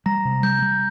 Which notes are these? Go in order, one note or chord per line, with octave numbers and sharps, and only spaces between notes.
G3 A#5 A#6
C3
G3 G6
G3